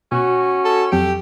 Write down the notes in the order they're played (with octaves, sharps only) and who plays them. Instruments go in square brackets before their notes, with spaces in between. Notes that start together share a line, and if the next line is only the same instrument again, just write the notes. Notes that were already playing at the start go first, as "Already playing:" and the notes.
[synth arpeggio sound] B2 [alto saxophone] C#4 [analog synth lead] F#4
[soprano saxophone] A4
[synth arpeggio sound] F2 F#3 D7 [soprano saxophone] G4 [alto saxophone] A4